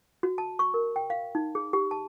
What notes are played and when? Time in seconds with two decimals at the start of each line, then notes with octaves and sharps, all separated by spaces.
0.23 F#4
0.38 A5
0.59 C#6
0.74 A#4
0.96 G5
1.10 F5
1.35 D#4
1.55 G#4
1.73 G4
1.91 A5